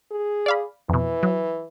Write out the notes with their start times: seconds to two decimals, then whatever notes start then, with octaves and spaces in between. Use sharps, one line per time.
0.11 G#4
0.46 D5 F5 B5
0.89 F2 B2 E3
1.23 F#3